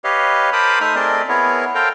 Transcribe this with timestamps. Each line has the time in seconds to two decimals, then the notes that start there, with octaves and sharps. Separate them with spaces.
0.04 G4 B4 C#5 D#5 F5
0.53 A#4 C5 A5 B5 D6 D#6
0.81 A3 D#4 C5 E5 D#6 F6
0.95 A3 C4 G#4 A#4 D5 D#5
1.29 B3 E4 G#4 A#4 C#5
1.75 A4 A#4 C5 F5 G5 A#5